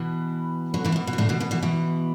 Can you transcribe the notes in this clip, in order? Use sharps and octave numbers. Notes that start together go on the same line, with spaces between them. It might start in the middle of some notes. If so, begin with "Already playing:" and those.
Already playing: B2 E3
D3 F#3
B2 E3
A2
B2
B2
E3
A2 D3
B2 E3
B2 E3
B2 E3
B2 E3